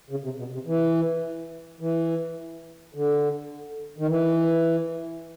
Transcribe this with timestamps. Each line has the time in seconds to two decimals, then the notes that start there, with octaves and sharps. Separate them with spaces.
0.11 C#3
0.24 C3
0.39 B2
0.53 C3
0.66 E3
1.81 E3
2.94 D3
3.99 D#3
4.08 E3